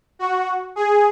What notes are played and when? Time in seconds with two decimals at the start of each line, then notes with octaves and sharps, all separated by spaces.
0.19 F#4
0.76 G#4